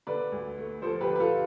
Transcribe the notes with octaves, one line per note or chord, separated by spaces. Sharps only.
D3 B4 D5
D2
A3
F3 A4 C5
G4 B4
D3
B4
F4 A4